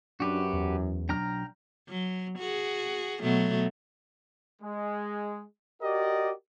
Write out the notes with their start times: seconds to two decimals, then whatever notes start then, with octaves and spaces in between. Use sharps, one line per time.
0.20 F#2 D4 F#4 G4 B4
0.53 E2
1.09 B1 F#3 D4 G5 A#5 F6
1.89 F#3
2.39 F#4 G#4
3.22 B2 F#3 A3
4.62 G#3
5.81 F#4 G4 A#4 D5 D#5